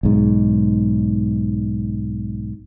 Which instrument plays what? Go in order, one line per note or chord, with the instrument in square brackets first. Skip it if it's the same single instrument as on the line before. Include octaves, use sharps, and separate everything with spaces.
[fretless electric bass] B1 G#2